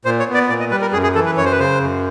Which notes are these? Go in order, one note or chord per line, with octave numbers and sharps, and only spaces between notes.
A#2 C5
C#5
B3
D5
A#2 D5
D#5
G3 B4
A#4
F#2 G#4
G#4
E3 A4
B4
F#2 C#5
C5
B4
C#3 C5
F#2